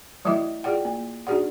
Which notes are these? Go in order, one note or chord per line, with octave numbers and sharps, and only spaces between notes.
E3 F#3 A3 E4 E5
F4 G#4 D5 F#5 G5
A#3
D4 D#4 F#4 G#4 D5 F#5